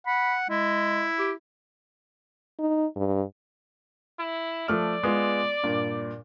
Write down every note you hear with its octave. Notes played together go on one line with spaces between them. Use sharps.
F#5 B5
G#3 E4
G4
D#4
G2
E4
F3 A3 D5 F6
G#3 B3 F4
G2 A#2